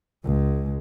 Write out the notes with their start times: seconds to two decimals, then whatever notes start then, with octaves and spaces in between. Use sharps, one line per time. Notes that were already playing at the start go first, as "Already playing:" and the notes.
0.24 C#2 G#3